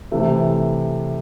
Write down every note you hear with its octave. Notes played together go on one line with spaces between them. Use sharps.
C3 E3 A3